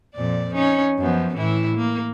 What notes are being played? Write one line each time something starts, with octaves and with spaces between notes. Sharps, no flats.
F2 A#2 D5
C#4 D#4
F#2 F3 B3
A2 E3 E4
A#3